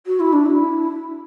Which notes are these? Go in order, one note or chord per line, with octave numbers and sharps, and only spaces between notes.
F#4
E4
D4
E4